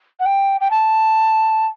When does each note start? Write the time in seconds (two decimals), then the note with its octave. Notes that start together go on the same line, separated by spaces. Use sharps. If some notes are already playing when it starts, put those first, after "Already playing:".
0.20 F#5
0.25 G5
0.61 G5
0.71 A5